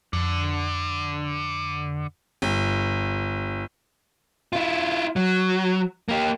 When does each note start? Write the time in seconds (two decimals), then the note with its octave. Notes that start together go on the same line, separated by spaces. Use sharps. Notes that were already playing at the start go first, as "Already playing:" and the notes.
0.13 F2 D3
2.42 G1
4.53 E4 F4
5.16 F#3
6.09 A#3 G4